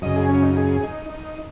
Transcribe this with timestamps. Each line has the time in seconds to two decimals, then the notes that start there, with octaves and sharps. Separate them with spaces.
0.02 F#2 C#3 D#5
0.16 G#4
0.29 C#4
0.42 D#4
0.56 G#4
0.83 D#4
1.10 D#4